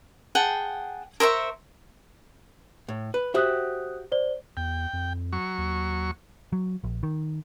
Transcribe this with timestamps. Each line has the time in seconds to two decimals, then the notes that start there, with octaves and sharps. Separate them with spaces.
0.35 G#4 F#5 G5 A5
1.20 A#4 C5 E5 C#6
2.88 A2
3.14 B4
3.34 F#4 G4 C5 E5 D#6 F#6
4.12 C5 D5 G7
4.57 E2 G5
4.93 F2
5.33 F#3 C#6
5.58 D#2
6.53 F#3
6.84 A#1
7.03 D#3